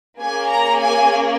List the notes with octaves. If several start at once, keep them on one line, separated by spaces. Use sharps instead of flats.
A#3 C#4 G#4 G#5
A#5
G#5